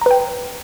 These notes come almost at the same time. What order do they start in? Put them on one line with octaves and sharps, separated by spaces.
A#5 B4 G5